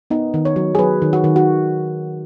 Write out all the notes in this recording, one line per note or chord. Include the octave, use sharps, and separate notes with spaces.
B3 D#4
D#3
C#5
F#3
G#4
F#3 B4
D#3
F#4
D#3
F#4